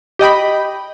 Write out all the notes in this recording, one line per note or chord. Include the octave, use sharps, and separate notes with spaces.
G4 D#5 G5 B5